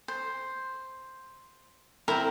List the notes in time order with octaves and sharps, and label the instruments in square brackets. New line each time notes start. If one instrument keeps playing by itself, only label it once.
[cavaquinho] C5
[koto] C4 E4 [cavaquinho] A#4